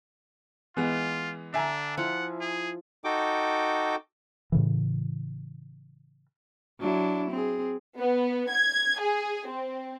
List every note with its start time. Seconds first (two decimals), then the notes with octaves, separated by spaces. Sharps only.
0.77 E3 G#3 B3 F4
1.54 D3 D4 E5 G#5 A#5
1.97 F3 E4 F4 F#5
2.41 G#4
3.04 D#4 F#4 A4 G5 D6
4.52 A2 C#3 E3
6.80 F#3 D4 E4
7.30 C4 G#4
7.98 B3
8.51 G#6
9.00 G#4
9.48 C4